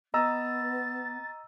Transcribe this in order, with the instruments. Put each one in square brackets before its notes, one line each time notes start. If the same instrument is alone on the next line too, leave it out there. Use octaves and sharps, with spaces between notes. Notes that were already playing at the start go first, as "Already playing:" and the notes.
[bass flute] B3 [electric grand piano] D#5 A#5 E6 [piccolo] A6